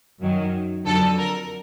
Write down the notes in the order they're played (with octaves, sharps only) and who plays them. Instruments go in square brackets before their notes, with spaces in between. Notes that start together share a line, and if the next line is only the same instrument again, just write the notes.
[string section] F#2 D#3 F#3
F2 D3 F#3 A4
A#4